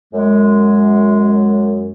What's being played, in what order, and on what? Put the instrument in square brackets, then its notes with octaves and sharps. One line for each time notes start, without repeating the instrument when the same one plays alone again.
[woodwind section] F#2 G#3